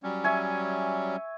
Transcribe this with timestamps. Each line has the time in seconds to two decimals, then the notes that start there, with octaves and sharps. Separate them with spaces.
0.03 F#3 G3 C#4
0.24 E5 G#5 C#6